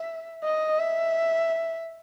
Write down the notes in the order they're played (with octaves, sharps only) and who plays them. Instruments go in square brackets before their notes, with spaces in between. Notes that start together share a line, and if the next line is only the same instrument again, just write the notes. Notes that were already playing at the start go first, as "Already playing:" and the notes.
Already playing: [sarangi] E5
D#5
E5